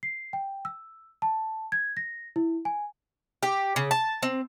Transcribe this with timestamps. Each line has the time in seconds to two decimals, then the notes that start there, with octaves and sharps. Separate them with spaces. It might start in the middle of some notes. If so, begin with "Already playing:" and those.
0.03 C7
0.33 G5
0.65 E6
1.22 A5
1.72 G#6
1.97 A#6
2.36 E4
2.65 G#5
3.43 G4
3.76 C#3
3.91 A5
4.23 C4